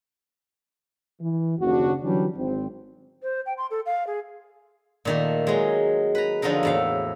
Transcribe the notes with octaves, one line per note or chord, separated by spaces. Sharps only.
E3
F#1 D#2 C#3 D4 F#4
D3 E3 F#3 G3 C#4 D4
G#1 C4
C5
G5
C6
A4
F5
G#4
A#2 D#3 A3
F#3 G#3
B4 A#5
D3 F3 F#3 D#4 A#4
E2 A2 F5